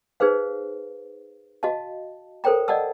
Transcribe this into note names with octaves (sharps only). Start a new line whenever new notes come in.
D#4 G#4 B4 C5 F5
F#4 D#5 F5 A5
A4 A#4 C5 C#5 G5 A#5
D5 D#5 F#5 A5 E6